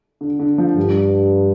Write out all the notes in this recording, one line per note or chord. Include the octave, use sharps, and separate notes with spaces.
D3
D3
F3
G2 G3